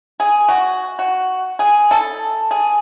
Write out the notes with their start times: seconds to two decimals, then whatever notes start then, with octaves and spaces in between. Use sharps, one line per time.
0.20 G#4
0.49 F#4
0.99 F#4
1.59 G#4
1.91 A4
2.51 G#4